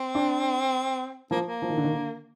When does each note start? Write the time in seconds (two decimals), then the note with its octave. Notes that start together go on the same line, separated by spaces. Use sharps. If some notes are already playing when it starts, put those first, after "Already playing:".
Already playing: C4
0.15 D4
1.31 F3 A#3
1.45 A#3
1.62 F3
1.70 D#3
1.77 D3
1.84 D#3
1.92 D3